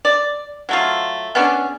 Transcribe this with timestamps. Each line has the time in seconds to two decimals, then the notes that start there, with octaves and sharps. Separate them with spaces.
0.05 D5
0.69 F#3 A3 F4
1.35 B3 C#4 D4 G#4